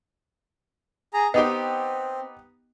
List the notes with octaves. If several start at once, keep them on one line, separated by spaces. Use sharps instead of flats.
G#4 A#5
B3 C4 D#4 G4 D#5